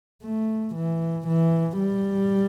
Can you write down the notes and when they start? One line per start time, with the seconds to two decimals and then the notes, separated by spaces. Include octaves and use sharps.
0.23 A3
0.75 E3
1.27 E3
1.80 G3